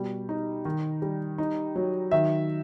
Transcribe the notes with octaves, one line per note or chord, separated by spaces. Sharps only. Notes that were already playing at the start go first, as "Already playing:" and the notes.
Already playing: B2 G3
D#4
D#3
G3
D#4
F#3
D#3 E5